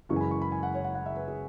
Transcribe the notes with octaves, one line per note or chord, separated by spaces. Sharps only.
F#1 F#2 E3 G#3 C#6
G#5
B5
C#6
B5
G#5
F#5
C#5
F#5
F#5
E5
B4
G#4